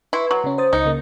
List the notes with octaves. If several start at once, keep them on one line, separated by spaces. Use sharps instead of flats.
E4 B4 C6 C#6
F#3
C#3 C#4
C5 D#6 A6
C#2 D#4 D#5 C#7
C#3 A#3